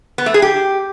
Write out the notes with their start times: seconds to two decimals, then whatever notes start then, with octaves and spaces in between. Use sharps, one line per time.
0.18 B3
0.26 A3
0.34 G#4
0.42 G4